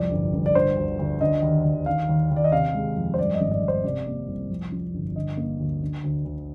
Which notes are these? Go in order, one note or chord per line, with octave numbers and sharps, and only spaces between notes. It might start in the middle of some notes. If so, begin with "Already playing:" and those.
Already playing: C2 F2 D5
G1
G1
D5
D3 C5
D2
D2
D3 D#5
D#2
D#2
D#3 F5
D#2
D#2
D5
D#5
C3 F5
G#3
F2
C5
G2 D5
D#5
G#1
D5
G#1
C5
C3 D5
A#3
C2
F2
F3
G1
D3 D#5
A#3
D2
D3
D2
D2